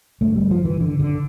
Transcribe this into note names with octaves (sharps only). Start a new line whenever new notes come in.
G1 G2 D3 A3
G3
F3
E3
D3
D3